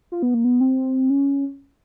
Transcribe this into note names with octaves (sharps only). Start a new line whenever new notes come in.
F4
B3
A#3
B3
C4
C#4